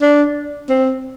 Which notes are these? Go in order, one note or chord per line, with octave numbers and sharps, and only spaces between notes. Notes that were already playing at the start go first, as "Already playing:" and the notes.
D4
C4